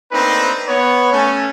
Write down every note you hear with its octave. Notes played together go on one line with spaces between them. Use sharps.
A3 A#3 C4 D4 D#4 B4
B3 C#5
A3 C#4